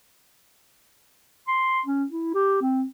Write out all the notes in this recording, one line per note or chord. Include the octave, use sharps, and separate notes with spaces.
C6
C#4
E4
G4
C4